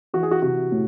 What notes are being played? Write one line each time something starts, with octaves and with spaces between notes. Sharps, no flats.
E3 F#4
G#4
F#4
C3 F#4
A2